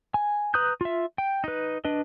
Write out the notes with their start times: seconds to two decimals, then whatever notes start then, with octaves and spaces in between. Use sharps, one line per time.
0.14 G#5
0.54 B4 A#5 D#6 F#6 G6
0.81 F4 E5
1.18 G5
1.44 D#4 B4
1.85 D4 B4 D#5